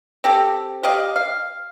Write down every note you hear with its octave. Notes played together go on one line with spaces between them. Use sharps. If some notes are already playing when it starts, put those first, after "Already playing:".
C4 G4 A4
G4 D5 D#5 F5
F5